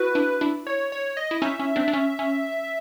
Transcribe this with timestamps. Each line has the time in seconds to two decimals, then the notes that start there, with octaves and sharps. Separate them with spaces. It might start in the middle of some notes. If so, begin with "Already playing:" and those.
Already playing: E4 F#4 B4
0.15 D4 E4
0.41 D4 E4
0.67 C#5
0.92 C#5
1.17 D#5
1.31 E4
1.42 C#4 D#4 E5
1.59 C#4
1.76 C4 D4
1.88 D4
1.93 C#4
2.19 C#4